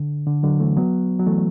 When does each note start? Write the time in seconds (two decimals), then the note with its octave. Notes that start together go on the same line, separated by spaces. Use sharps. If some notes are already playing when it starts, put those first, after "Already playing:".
Already playing: D3
0.27 D3
0.43 D3 F#3
0.60 E3 A3
0.77 F#3 B3
1.19 F#3
1.27 E3 A3